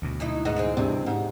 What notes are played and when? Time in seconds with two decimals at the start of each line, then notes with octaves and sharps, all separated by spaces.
0.02 D2 B2
0.20 F#3 D#4 E4
0.45 G#2 B3 F#4 D#5
0.56 E3 G#3 C4
0.77 G2 C3
1.06 G#2